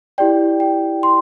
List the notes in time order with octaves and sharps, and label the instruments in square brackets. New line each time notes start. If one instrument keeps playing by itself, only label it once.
[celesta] E4 G4 D5 G5
G5
C6